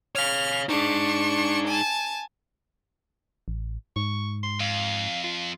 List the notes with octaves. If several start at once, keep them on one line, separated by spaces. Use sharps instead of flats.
C#5 F5 F6
D4 D#4 G#4 C#6
G#5 A5
A1
G#2 C#6
C6
F2 F5
F4